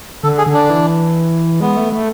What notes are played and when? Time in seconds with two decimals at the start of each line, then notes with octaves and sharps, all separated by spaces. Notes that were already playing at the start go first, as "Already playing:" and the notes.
0.23 D3 A4
0.38 G#4
0.46 D3
0.54 D4
0.70 E3
1.61 G#3 B3
1.76 A3
1.92 A3